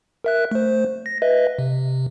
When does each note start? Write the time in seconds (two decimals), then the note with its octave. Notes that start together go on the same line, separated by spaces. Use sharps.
0.24 A#4 E5 F#6
0.52 A3 C5
1.06 A#6
1.22 B4 D#5 E5
1.59 C3